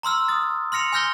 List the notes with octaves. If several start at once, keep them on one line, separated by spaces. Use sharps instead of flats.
A#5 C6 E6 F6
D#6 A6
C6 F6 A#6 C#7 F7
G#5 C6 F6 G6 A#6 G7